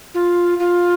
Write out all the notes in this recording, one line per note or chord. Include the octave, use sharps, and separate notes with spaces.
F4
F4